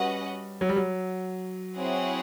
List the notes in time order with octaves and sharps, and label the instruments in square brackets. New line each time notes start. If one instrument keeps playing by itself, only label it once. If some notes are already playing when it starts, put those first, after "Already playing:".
Already playing: [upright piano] G3 [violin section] C#4 F#4 B4 D#5 F#5
[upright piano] F#3
G3
F#3
[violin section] C4 E4 G#4 C#5 F#5